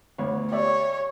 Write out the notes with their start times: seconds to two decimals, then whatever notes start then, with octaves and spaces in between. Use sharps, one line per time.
0.18 D2 B3 C#5
0.52 G4 C#5 D5 E5